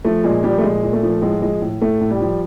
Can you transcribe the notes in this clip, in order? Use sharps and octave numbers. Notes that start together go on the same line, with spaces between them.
F3 A3
A#2 G#3
F3 G3
A3
A#2 G#3
A#2
A3
F3
A2 G#3
F3 G#3
A2
A2 A3
A2
G3
F3